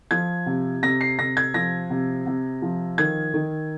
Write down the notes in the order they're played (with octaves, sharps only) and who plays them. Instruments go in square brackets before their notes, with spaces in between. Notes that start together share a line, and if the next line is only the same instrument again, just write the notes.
[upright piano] F3 G#6
C3
C3 A#6
C7
C3 A#6
G#6
F3 A#6
C3
C3
F3
D#3 G#6
D#3